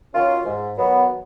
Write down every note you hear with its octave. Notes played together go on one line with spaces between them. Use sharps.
D#3 F#3 C#4 F4
G#2
D#3 F#3 B3